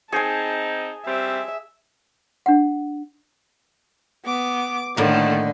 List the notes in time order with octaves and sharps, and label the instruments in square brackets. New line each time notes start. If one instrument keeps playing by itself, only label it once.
[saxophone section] C4 D#4 [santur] G#4 G#5 [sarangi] A5
[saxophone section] G3 C4 [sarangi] E5
[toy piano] D4 F#5
[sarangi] B3 [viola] D6
[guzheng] A2 A#3 [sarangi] D3 [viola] D#3 A3